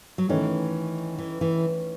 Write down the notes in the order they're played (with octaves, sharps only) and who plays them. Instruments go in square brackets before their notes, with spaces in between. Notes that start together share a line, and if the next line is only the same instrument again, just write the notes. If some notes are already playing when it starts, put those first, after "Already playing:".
[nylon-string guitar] F#3
[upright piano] D#3 A3 C#4 [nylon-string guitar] E3
[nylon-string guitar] E3
E3